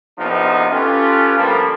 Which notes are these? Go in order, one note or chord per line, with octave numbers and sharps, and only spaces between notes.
A#1 C3 F3 B3 D#4
C#4 F4 G4 A4 B4
D3 F3 G3 A3 A#3